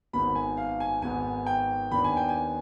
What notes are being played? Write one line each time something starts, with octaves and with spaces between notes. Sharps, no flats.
G#1 G#2 D#3 B3 B5
G#5
F5
G#5
G#1 G#2 D#3 B3 G#5
G5
D#2 D#3 B3 D4 B5
G#5
G5
G#5